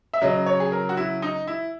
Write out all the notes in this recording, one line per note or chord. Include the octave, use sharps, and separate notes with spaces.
E5
C#3 F#3 D#5
C#5
G#4
A#4
F#4
E4
D#4
E4